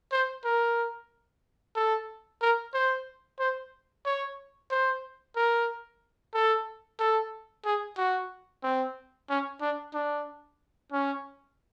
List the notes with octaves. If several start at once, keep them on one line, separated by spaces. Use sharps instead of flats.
C5
A#4
A4
A#4
C5
C5
C#5
C5
A#4
A4
A4
G#4
F#4
C4
C#4
D4
D4
C#4